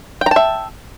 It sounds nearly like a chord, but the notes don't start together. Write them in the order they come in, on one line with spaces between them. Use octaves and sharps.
G5 A#5 A5 E5